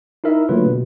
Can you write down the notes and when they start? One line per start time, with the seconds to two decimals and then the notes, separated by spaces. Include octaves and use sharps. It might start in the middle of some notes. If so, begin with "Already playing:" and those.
0.24 D#4 E4 A#4 E5
0.49 D3 F#3 A3 A#3 F4 B4
0.66 B2